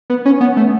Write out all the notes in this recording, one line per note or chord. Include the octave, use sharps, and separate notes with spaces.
B3
C#4
B3
A3